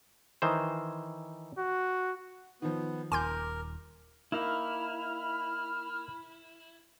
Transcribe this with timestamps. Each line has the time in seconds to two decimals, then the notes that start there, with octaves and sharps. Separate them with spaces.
0.42 D#3 E3 C5
1.59 F#4
2.62 D#3 F3 B3
3.12 D#1 A#4 G#5 C6 D6 G6
4.32 A#3 D#4 E4 B5 F6